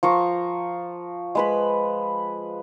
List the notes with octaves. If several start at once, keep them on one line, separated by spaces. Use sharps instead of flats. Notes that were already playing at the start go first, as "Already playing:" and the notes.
F3 A#5 C#6
G#3 B4 B5